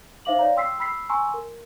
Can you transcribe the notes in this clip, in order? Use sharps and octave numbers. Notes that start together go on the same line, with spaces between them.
D#4 C5 E5 F5 D6 F#7
C#5 D5 F5 A#5
G5 C6 E6 B6 C7
B5 E6 B6 C7
G#5 A#5 C6 C#6 E6
A#4